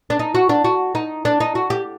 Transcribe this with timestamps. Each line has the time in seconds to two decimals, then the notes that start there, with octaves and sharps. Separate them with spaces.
0.10 D4
0.19 D#4
0.35 F#4
0.49 D4
0.64 F#4
0.95 D#4
1.25 D4
1.40 D#4
1.55 F#4
1.70 G4